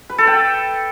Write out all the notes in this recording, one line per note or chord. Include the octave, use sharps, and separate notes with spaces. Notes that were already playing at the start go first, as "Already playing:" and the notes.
B4
A4
G5